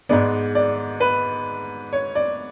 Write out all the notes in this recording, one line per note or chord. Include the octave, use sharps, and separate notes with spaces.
G#2 G#3 B3 D5
D5
B4
C#5
D5